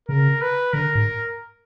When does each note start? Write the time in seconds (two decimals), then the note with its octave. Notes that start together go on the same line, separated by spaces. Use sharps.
0.09 C#3 A#4
0.41 B4
0.73 D3 A#4
0.95 G#2